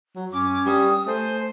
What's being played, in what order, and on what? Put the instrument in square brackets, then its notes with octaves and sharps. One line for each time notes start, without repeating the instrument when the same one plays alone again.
[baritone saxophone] F#3
[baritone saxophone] F#2 [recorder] C#4 [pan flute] D6
[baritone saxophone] G3 [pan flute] D#6
[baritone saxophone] A3 [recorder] C5 [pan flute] G#5